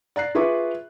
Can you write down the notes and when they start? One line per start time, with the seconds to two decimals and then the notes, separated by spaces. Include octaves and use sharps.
0.16 D5 A#5 F#6 C7
0.35 F4 G#4 B4 E5 C#6 D6